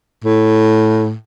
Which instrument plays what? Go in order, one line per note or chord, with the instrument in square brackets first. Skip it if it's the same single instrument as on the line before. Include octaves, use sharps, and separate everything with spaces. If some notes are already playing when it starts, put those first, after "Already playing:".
[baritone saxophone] A2